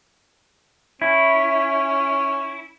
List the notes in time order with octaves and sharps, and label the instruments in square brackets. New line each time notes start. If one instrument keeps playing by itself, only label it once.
[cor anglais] C#4 [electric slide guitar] E4